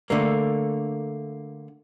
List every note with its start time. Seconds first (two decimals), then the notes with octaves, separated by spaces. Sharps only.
0.10 D3 A3 A#3